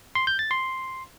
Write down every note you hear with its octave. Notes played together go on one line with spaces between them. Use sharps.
C6
G6
A6
C6